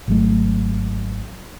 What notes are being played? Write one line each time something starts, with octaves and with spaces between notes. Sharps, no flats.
G#1 F#3 A3